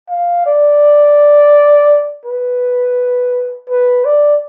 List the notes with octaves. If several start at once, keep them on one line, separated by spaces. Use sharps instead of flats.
F5
D5
B4
B4
D5